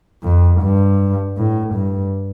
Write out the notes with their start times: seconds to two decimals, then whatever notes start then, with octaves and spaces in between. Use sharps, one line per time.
0.23 F2
0.62 G2
1.37 A2
1.74 G2